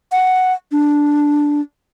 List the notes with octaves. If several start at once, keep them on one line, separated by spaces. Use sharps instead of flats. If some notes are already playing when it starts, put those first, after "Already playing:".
F#5
D4